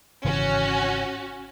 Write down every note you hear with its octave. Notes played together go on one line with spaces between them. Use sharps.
G#1 C#3 E3 C#4 F#4